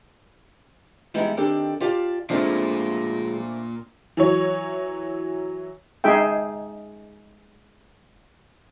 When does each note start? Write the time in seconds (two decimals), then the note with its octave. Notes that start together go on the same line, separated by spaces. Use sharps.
1.14 E3 G3 G#3 B3 D#4 E4
1.37 D#3 C4 D4 G4 A4
1.80 F4 G4 D5 F5 G#5 A5
2.30 A#2 F3 G#3 A3 C4 D4
4.17 E3 F#3 C#5
6.04 G#3 D#4 G#4 E5 G5